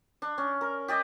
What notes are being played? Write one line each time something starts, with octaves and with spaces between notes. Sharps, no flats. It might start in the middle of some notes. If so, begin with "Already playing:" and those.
D4
C#4
A#4
G4 D5 D#5